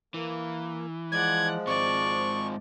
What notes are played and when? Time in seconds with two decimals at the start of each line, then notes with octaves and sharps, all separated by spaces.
0.14 E3 A#3
1.12 F3 G#3 D5 F#5 G#6
1.67 G#2 C4 D5 C#6